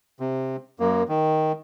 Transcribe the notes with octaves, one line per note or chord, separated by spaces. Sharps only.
C3
F#2 A#3
D#3